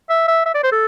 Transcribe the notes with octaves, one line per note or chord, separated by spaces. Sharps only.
E5
E5
E5
D5
C5
A4